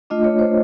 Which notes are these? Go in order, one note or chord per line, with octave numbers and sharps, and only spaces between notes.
A3 D4 F4 D#5
C#5
C5